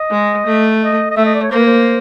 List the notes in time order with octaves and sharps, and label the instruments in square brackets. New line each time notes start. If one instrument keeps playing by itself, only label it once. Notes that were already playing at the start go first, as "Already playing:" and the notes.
Already playing: [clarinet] D#5
[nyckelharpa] G#3
A3
[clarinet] D#5
D#5
[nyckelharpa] A3 [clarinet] E5
[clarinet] D#5
D5
C#5
[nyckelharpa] A#3 [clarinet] C5
[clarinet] B4
C5